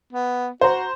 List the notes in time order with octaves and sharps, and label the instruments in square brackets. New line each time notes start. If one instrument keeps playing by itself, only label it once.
[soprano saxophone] B3
[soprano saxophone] F#4 [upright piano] C5 A#5